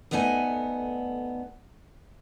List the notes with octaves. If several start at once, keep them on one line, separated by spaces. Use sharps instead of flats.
D2 A3 B3 D#4 D#5 G#5